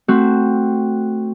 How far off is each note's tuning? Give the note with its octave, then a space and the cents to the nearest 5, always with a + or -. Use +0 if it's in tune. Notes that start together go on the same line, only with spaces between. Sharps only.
A3 +0 C4 +0 F#4 +0